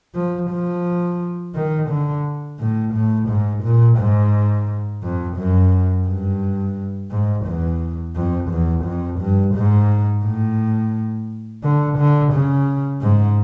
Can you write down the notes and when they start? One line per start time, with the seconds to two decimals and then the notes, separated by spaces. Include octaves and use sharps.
0.15 F3
0.51 F3
1.55 D#3
1.89 D3
2.59 A2
2.93 A2
3.28 G#2
3.63 A#2
3.98 G#2
5.03 F2
5.37 F#2
6.07 G2
7.11 G#2
7.46 E2
8.15 F2
8.50 E2
8.85 F2
9.19 G2
9.54 G#2
10.24 A2
11.63 D3
11.97 D3
12.33 C#3
13.02 G#2